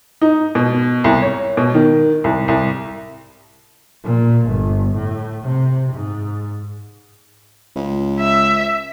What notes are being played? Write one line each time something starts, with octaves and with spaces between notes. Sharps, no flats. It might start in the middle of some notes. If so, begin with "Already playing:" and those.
D#4
B2
C2
C#5
B2
D#3
C2
C2
A#2
G1
A2
C3
G#2
C#2
E5